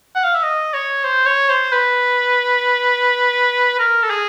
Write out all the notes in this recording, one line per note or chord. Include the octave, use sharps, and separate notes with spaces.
F#5
F5
E5
D#5
C#5
C5
C#5
C5
B4
A#4
A4
G#4